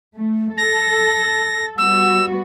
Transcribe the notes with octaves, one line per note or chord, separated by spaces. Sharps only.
A3
A4 A#6
G3 B3 F#4 E6